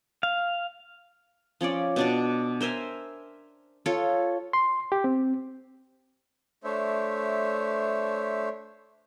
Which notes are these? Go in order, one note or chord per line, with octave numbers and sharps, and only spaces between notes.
F5
F3 C#4 C#5 D5
B2 D4 D5
A#4 C5 E5 G#5
F4 A4 C#5
C6
G4
C4
A3 D4 C5 C#5 E5